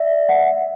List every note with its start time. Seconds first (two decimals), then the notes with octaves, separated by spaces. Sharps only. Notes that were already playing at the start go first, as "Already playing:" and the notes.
Already playing: D5 E5
0.29 F#5
0.35 E5